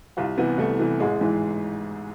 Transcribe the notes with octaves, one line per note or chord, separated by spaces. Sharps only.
C2 F4
C3 E3 B3
C2 A3
C3 E3
A1 G#3
G#2 E3